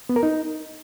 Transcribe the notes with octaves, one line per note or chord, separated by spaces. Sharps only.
B3
A#4
D#4